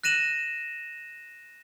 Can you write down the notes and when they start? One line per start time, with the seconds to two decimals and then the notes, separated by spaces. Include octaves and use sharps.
0.04 F#6 A#6 D#7 E7 F#7